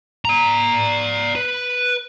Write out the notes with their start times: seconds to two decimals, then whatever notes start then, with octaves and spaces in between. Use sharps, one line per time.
0.25 D5 A#5
1.36 B4